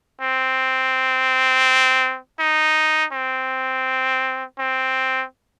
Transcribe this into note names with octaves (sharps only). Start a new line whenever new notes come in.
C4
D#4
C4
C4